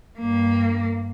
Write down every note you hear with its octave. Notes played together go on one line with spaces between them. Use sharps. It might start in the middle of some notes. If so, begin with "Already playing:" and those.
G2 A#3